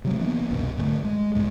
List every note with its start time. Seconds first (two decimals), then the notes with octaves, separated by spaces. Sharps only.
0.04 C3 F#3 A3
0.19 E3 A#3 B3 D4
0.50 C2 F#2 B2
0.77 G#2 D3 G3 A3
1.05 G#3
1.35 C2 G#2 G#3